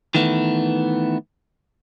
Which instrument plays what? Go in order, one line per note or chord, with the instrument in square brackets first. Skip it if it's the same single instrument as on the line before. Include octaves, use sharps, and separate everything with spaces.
[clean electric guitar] D#3 E3 A3 B3